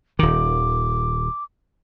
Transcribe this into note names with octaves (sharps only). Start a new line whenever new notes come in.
D#1 D#3 D6